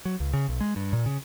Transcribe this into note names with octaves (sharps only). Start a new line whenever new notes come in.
F#3
C#2
C#3
B1
G#3
G2
A#2
C#3